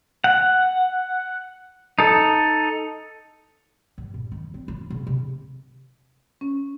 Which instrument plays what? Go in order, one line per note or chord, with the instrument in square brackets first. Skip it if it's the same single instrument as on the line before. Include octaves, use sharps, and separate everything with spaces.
[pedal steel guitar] F#5
D#4 A4
[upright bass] G2
A#1
D#3
C4
F4
C#3
C3
[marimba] C#4